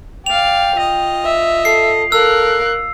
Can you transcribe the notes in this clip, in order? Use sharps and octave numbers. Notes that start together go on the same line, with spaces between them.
D5 F5 G5 F7
F4 D#5
E5
A4 C7
A4 A#4 F5 E6 F#6